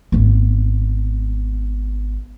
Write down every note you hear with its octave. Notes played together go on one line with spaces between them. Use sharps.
G#1 B3